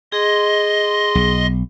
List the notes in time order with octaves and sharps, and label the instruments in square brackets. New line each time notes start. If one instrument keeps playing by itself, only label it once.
[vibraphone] G#4 [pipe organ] D#5 C6
[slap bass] B1